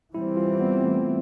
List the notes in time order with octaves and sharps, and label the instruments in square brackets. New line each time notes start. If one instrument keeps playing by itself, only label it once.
[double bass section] E3 G3 C4 [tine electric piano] E4
[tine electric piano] F4
B3
A3